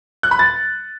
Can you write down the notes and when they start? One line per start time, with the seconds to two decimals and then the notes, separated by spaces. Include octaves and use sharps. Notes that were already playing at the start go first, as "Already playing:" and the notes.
0.23 F#6
0.31 B5
0.39 A6